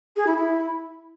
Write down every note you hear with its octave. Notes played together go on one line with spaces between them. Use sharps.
G#4
E4
E4